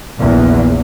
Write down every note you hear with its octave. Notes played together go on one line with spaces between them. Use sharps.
A#1 E2